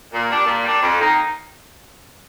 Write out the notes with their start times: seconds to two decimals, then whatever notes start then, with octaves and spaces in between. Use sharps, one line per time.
0.12 A#2
0.28 G3 D4
0.46 A#2
0.63 G3 D4
0.81 F2
0.99 D#3 A#3 D#4